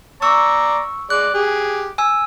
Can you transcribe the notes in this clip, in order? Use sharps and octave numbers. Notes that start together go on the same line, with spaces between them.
D5 A#5 C#6 E6
G#3 D5 F#6
G4 G#4
G#5 E6